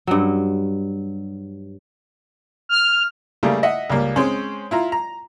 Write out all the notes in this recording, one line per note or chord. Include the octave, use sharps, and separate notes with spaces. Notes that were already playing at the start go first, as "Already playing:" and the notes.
G2 F#3
F6
C#3 G3 A3 A#3
D#5 E5 F#5
C#2 G3 A#3
G#3 C4 C#4
E4 F4 A#5
A#5